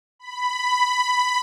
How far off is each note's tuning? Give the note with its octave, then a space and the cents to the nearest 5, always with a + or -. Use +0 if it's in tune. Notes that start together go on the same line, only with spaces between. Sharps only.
B5 +10